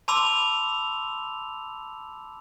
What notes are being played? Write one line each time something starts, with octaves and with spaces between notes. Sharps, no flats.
A5 B5 C6 D6 E6 F7